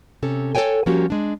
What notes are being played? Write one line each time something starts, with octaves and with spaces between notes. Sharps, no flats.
C3 C#4 A4
A4 A#4 C#5 G5 G#5
F3 G3 A#3 C#4 F#4 G4
G#3 D4